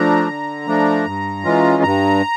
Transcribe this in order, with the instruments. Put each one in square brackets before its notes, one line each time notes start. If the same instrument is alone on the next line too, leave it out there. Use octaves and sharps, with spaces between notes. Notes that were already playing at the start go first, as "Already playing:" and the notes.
Already playing: [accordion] F3 A3 D4 A#5
D3
F3 A3 D4
G2
E3 G#3 C#4 F4
G2 A#5